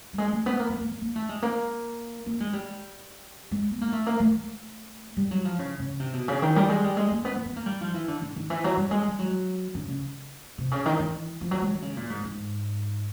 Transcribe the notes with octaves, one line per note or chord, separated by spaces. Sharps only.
G3
G#3
A3
B3
A#3
B3
A#3
B3
A#3
A3
G#3
A#3
A#3
G#3
G3
G#3
B3
A#3
A3
A#3
A3
G3
F#3
F3
C#3
C#3
C3
B2
C#3
D#3
G3
G#3
G3
G#3
A#3
B3
A#3
B3
A#3
G3
F3
E3
D3
D3
D#3
E3
F#3
G3
G#3
G3
F#3
D3
C#3
C3
C#3
D#3
E3
F3
F#3
G#3
D3
C#3
A#2
G#2
G#2